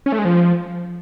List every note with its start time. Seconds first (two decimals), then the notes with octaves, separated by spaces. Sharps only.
0.06 C#4
0.12 A3
0.19 G#3
0.25 F3